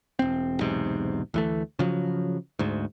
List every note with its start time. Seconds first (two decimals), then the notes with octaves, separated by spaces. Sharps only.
0.19 E1 C4
0.60 B1 E2 G#2 C3
1.34 D2 E3 A3
1.79 C#3 F3 F#3
2.59 D2 G#2